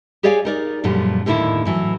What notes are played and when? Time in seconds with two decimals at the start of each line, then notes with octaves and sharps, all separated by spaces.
0.23 G4 G#4 C#5 D5 F5 G#5
0.45 D#4 A#4 D5
0.84 F#2 A#2 D3 F3 G3
1.26 D#2 A2 D3 A#3 E4
1.65 A2 E3 F#3